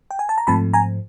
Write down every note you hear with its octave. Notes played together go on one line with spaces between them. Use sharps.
G5
G#5
A5
A#5
G#2 F3 A3 C4 A5 B5
G#5 A#5